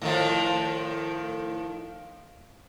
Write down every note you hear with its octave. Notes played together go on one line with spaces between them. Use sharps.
A2 D#3 F3